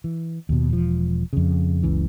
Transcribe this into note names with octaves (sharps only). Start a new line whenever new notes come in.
E3
D#2 B2
E1 F3
F2 C#3
F#1 C#2 C#3 E3